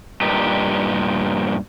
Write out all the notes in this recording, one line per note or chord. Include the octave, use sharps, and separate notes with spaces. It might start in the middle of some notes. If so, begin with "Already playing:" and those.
G2 A#2 D#4 G4